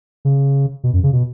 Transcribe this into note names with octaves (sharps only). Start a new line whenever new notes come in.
C#3
B2
F#2
C#3
B2